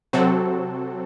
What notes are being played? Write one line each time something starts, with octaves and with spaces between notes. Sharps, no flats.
C3 F#3 C4 F#4 A4